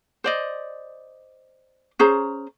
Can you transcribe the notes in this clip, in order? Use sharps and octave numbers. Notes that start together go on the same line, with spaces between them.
C5 D5 D#5
C#4 G#4 C5 A#5